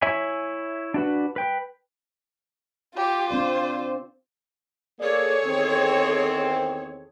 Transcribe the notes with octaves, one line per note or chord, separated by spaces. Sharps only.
E4 C#5 E5 G#5 B5
D4 F#4 B4
B4 G5
F4 G4
C4 D4 C5 D5
A#3 G#4 A4 C#5 D5
E2 D#3 C4